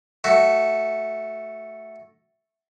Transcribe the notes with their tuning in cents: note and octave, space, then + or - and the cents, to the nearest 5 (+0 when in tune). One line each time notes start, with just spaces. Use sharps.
A3 +0 F#4 +10